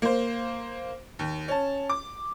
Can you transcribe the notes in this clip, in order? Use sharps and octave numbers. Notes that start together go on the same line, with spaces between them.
A#3 C5
D#2
C#4 A5
D6